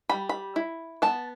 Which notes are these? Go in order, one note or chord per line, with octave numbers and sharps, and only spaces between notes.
G3 B5
B5
E4
B3 A5